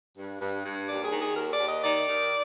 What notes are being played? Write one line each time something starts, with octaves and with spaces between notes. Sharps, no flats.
G2
G2
G2
D#2 D5
G#4
D#3
G#4
D#2 A#4
D5
D#2
D#5
D#3 D5
D#3